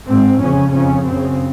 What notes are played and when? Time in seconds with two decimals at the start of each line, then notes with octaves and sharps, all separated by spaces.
0.08 G#2 C4
0.40 F2 C#3 C#4
0.72 F2 C#3 C#4
1.04 F#2 C#3 C4